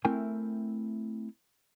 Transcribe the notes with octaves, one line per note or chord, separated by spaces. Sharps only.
A3 C4 E4 A#4 G5 G#5